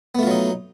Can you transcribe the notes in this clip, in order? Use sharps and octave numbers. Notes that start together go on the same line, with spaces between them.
F#3 A3 B3 D#4 F4